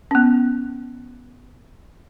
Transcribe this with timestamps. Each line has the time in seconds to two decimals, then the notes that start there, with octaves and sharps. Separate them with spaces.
0.11 B3 C#4